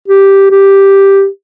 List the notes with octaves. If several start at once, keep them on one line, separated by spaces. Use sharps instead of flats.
G4
G4